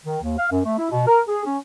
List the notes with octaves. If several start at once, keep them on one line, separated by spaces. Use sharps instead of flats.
D#3
D#2
F5
F#2
A3
E4
B2
A#4
G#4
C#4